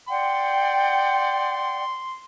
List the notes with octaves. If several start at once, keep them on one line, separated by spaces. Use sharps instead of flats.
D5 F#5 G5 C6